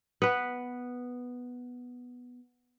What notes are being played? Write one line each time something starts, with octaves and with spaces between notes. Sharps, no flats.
B3 B4